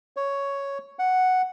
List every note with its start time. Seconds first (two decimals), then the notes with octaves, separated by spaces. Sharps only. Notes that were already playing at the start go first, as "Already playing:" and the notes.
0.17 C#5
0.99 F#5